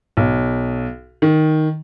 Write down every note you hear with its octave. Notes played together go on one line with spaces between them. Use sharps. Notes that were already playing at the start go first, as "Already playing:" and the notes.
B1
D#3